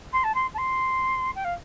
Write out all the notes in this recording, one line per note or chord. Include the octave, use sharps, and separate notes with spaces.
C6
A5
C6
A5
C6
G5
F5